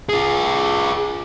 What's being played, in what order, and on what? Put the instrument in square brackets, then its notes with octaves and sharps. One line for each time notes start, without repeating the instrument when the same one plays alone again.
[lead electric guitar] F4 G#4